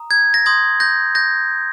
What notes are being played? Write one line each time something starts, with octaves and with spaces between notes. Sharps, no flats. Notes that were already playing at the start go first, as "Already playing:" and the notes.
Already playing: A#5 D#6
G#6
A#6
C6 D#6 G6 G#6
G6 A#6
G6 A#6